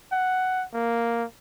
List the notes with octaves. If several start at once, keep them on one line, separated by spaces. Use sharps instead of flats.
F#5
A#3